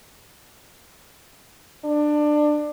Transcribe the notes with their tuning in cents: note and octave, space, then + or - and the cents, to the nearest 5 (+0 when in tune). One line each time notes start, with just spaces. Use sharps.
D4 +20